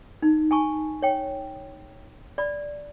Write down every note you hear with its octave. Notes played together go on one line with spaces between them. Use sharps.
D#4
G#5 A5 C#6
C#5 G5
D5 B5